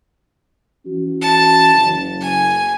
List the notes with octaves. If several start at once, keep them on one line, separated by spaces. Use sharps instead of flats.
E3 C#4 F#4
A5
F#1
G#5